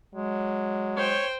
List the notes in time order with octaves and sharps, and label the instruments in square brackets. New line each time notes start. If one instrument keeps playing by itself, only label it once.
[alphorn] F#3 [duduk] G#3
[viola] C5 G5 [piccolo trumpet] C#5